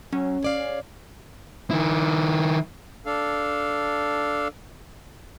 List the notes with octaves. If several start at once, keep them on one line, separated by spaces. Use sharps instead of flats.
F#3 C#4
G#4 D5 F5
D#3 E4
D4 A4 F5